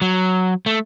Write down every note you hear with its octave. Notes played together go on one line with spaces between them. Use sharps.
F#3
A3